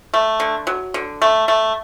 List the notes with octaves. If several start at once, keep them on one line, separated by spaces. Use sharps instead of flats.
A3
D3
F#3
D3
A3
A3